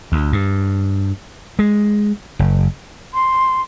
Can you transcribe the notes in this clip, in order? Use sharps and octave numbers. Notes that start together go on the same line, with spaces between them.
D2
G2
G#3
F#1
C6